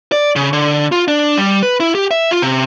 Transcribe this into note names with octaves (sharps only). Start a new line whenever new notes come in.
D5
C#3
D3
F4
D4
G3
B4
E4
G4
E5
F4
C3